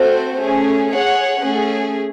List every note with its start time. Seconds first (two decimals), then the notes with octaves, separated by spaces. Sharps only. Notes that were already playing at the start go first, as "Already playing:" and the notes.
Already playing: A3 C4 F#4 C5
0.39 A3 C#4 G#4
0.91 G#4 C#5 F#5
1.43 A3 C#4 G#4